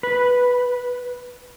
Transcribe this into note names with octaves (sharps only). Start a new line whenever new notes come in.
B4